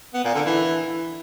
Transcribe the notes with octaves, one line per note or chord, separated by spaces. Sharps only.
B3
A#2
D3
E3